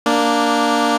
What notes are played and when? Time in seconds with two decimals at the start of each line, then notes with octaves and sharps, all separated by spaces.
0.06 A#3 D4